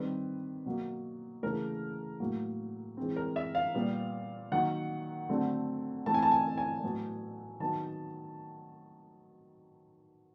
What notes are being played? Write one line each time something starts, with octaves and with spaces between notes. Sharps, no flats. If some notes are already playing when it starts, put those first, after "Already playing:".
Already playing: D#3 G3 C4 B4
B2 F#3 A#3
C#3 E3 A3 A#4
A2 F#3 A#3
E3 G#3 C4
A#4
E5
F5
A#2 G3 B3
D#3 F#3 A#3 F#5
D3 F#3 A3 C4
E3 A3 C4 A5
G#5
A5
G#5
G#5
A2 F#3 B3
D#3 F#3 B3 A5